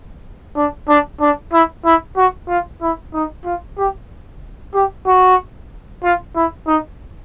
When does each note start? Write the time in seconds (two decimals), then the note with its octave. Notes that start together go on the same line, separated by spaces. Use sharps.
0.56 D4
0.88 D4
1.20 D4
1.52 E4
1.85 E4
2.17 F#4
2.48 F4
2.81 E4
3.14 D#4
3.45 F4
3.78 G4
4.74 G4
5.06 F#4
6.03 F4
6.35 E4
6.67 D#4